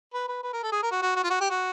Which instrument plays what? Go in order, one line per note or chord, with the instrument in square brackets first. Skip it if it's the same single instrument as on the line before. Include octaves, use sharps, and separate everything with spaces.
[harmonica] B4
B4
B4
A#4
A4
G#4
A#4
F#4
F#4
F#4
F4
F#4
G4
F#4